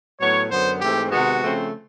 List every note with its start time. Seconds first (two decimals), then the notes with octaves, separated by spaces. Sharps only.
0.20 A2 F#3 B3 C#5
0.50 F#2 D3 F#3 B3 C5
0.81 G#2 E3 A3 C4 G4
1.11 C3 D#3 G#3 B3 F#4
1.41 C#3 F3 A3 C4